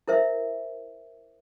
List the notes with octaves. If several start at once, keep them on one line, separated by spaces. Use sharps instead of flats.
E4 A#4 C5 E5